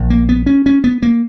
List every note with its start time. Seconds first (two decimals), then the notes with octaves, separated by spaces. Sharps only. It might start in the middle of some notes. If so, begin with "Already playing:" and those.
Already playing: A#1 A#2
0.10 A#3
0.29 B3
0.46 C#4
0.66 C#4
0.84 B3
1.03 A#3